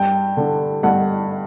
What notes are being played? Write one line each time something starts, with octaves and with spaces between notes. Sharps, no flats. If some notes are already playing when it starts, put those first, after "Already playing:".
Already playing: G2 G5
D3
G2 F#5